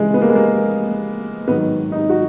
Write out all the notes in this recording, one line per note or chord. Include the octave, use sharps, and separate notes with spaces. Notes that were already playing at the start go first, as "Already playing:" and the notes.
Already playing: C#2 C#3 E3 G#3
B3
A#3
G#3
A#3
G#2 D#3 F#3 B3
D#4
F#4